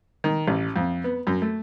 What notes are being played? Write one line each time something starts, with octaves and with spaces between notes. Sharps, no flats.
D#3
A1
F2
B3
F#2
A3